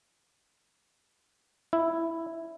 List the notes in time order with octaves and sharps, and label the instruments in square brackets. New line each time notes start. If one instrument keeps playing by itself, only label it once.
[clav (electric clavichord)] E4